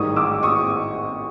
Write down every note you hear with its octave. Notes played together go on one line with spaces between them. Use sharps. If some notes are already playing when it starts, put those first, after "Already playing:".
Already playing: A1 G#2 D#3 G3 C#6 D#6
D6 E6
C#6 D#6